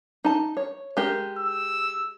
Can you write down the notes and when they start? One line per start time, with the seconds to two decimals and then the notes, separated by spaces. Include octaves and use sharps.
0.25 D#4 A5
0.57 C#5
0.97 G#3 G4 A#4
1.38 E6